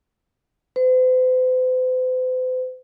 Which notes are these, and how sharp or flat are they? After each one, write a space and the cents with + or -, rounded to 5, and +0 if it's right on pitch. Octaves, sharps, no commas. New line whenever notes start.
C5 -45